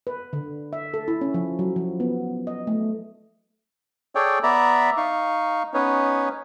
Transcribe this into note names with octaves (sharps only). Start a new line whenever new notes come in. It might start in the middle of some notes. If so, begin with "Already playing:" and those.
B4
D3
E5
A4
E4
C#4
F3
F#3
F3
B3
D#5
A3
G#4 A4 C#5 D5 G5
B3 D5 E5 A#5 B5
D#4 F5 C#6
B3 C#4 D#4 B4 C#5